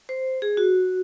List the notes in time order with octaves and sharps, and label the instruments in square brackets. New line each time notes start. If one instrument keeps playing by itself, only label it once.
[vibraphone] C5
G#4
F#4